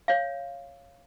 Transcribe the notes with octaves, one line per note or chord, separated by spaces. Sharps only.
C#5 F5